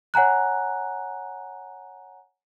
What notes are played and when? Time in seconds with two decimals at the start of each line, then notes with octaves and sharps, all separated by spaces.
0.14 C#5 F#5 G#5 A#5 F#6